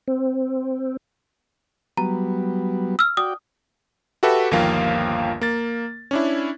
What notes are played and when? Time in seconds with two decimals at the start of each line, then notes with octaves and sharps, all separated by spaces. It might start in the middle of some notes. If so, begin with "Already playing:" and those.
0.08 C4
1.97 F#3 G3 B3 A#5
2.99 E6 F6
3.17 F#4 D5 G5 D#6
4.23 F#4 G4 A4 B4 E5
4.51 G1 D#2 F3 A#3 F5 G5
5.41 A#3 A6
6.11 C#4 D4 E4